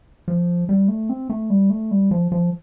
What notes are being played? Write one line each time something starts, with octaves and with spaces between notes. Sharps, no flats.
F3
G3
A3
C4
A3
G3
A3
G3
F3
F3